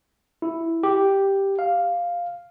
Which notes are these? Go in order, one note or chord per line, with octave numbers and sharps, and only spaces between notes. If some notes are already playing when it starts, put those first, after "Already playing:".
E4
G4
F5